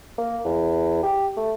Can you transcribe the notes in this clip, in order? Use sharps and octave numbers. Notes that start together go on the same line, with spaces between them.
A#3
E2
G4
A3